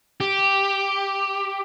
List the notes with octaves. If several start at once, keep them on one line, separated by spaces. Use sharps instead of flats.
G4